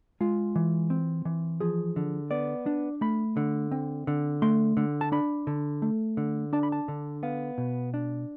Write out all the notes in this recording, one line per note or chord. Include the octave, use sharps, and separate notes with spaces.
G#3 F4
E3
C4
E3
F3 G#4
D3
B3 D5
D4
A3 B5
D3
C4
D3
A3 C6
D3
A5
D4 B5
D3
A3
D3
D4 A5
B5
A5
D3
B3 F5
B2
D4